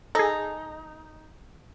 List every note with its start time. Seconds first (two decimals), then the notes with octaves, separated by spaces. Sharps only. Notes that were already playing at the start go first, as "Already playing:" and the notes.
0.15 D#4 G#4 A4